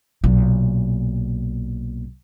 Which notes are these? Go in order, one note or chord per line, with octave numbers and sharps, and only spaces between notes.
B1 A#2